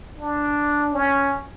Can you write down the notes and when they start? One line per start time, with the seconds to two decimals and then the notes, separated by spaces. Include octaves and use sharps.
0.19 D4
0.94 C#4